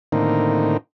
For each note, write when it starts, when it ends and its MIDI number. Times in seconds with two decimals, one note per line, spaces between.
0.12 0.77 45
0.12 0.77 50
0.12 0.77 51
0.12 0.77 58
0.12 0.77 60
0.12 0.77 63